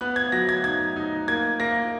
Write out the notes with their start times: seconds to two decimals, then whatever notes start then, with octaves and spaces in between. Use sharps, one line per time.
0.01 B3 F#6
0.16 G#6
0.32 F#3 A#6
0.49 G#6
0.64 D#4 G#6
0.96 D#4
1.28 A#3 G#6
1.60 A#3 A#6